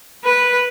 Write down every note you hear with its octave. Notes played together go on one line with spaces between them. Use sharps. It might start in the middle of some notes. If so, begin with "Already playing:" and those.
B4